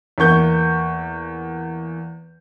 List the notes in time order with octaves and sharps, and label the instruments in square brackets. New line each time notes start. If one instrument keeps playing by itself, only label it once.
[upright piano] E2 A#3 C#6 G6